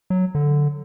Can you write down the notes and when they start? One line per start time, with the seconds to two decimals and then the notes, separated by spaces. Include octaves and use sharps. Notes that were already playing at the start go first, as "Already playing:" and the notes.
0.10 F#3
0.35 D3